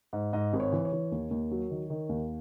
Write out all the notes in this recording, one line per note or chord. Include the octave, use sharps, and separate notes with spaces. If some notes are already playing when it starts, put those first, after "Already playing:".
G#2
G#2 D#5
G#1
C#5
E3
C#5
E3
D#2
D#2
F#3
D#3
D#3
D#2